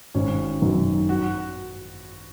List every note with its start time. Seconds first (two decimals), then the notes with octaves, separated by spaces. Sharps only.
0.15 G#1 C#4
0.62 F#2 D#3 F#3
1.09 F#4